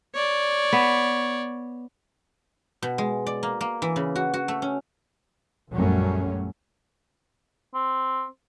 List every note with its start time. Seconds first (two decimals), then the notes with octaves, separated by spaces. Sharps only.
0.15 C#5 D5
0.73 B3
2.82 B2
2.98 G#3
3.26 D5
3.43 A#3
3.61 A#3
3.82 E3
3.96 C#3
4.16 F#4
4.34 F#4
4.48 A3
4.62 C#4
5.72 A#1 F#2 F#3 G3 A3 C#4
7.74 C4